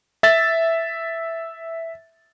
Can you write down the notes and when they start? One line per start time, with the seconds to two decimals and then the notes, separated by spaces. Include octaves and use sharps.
0.23 E5 A6